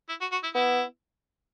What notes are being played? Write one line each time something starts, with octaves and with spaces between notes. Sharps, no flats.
E4
F#4
F#4
E4
B3 E4